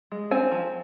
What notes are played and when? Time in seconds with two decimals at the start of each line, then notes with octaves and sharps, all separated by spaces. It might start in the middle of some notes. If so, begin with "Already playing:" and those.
0.12 G#3
0.31 C4 G#5
0.52 F3